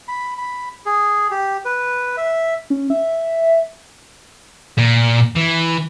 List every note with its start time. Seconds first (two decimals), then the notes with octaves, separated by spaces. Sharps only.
0.08 B5
0.38 B5
0.86 G#4
1.31 G4
1.65 B4
2.17 E5
2.70 C#4
2.90 E5
4.78 A#2
5.35 E3